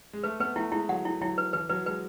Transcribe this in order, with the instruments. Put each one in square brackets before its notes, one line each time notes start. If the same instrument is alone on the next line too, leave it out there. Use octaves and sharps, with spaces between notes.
[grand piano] G#3
[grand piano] A3 [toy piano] B4
[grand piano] B3 [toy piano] B4
[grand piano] A3 [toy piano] E4
[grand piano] G#3 [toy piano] E4
[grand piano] F#3 [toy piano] F#5
[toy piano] E4
[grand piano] F#3 [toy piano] E4
[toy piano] B4
[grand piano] E3 [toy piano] B4
[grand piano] F#3 [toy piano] B4
[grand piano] G#3 [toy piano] B4